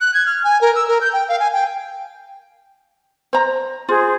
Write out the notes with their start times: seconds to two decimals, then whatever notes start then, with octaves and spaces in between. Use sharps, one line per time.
0.01 F#6
0.14 G#6
0.26 F6
0.44 G#5
0.61 A#4
0.75 E6
0.88 A#4
1.01 G6
1.13 G5
1.28 F5
1.40 G#5
1.53 G5
3.33 C5 A#5
3.89 F4 G#4 C5